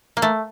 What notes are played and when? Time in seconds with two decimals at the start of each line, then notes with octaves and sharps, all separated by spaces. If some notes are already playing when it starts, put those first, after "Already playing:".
0.17 A#3
0.22 A3